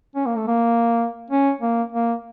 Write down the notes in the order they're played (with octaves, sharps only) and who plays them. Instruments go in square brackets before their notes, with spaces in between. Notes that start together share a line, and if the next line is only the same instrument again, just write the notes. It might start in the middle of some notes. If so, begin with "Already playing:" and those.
[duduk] C#4
A#3
A3
A#3
C#4
A#3
A#3